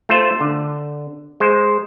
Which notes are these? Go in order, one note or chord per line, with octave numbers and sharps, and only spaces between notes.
A3 F4 C5
D3
G#3 C5